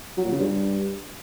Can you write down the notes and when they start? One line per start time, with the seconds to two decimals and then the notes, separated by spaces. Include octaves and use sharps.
0.17 F#3
0.25 A#2
0.32 C#3
0.39 G2